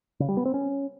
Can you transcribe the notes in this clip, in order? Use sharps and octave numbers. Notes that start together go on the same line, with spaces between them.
C#3
G3
B3
C4
C#4